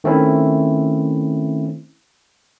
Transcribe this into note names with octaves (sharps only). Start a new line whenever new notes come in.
D#3 A3 C4 C#4 E4